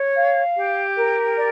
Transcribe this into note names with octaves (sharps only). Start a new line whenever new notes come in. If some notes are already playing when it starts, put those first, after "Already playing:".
Already playing: C#5
F5
G4
A#4
D5